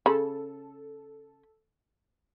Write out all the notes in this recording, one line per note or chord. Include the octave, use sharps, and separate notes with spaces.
C#3 A4 B5